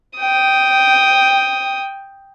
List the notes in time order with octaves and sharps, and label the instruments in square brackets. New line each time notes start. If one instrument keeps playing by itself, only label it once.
[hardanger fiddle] G5 D#6